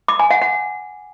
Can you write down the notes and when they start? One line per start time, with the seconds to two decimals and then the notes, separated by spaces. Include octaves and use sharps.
0.08 D6
0.19 G#5
0.31 F#5
0.42 F#5